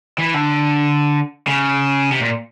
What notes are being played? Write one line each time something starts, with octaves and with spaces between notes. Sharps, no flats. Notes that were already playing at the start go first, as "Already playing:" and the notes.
E3
D3
C#3
C3
A#2